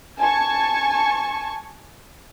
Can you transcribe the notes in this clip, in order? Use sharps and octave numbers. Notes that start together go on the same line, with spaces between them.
G#5 A5 C#6